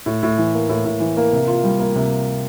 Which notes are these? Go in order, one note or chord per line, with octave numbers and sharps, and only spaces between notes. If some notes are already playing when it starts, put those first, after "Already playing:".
A2
A2
E3
A#3
A2
A2
E3
A#3
C3
F4
G3
A#3
C3